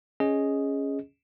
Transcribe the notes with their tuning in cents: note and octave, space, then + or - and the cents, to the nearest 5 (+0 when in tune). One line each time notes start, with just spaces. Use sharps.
C#4 +0 G#4 +0 D#5 +0